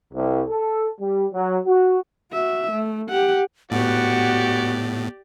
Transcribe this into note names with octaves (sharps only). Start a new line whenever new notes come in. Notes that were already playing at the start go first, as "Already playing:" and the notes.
C2
A4
G3
F#3
F#4
F#4 E5
A3
G4 F#5
A2 B3 F#4 G4 D5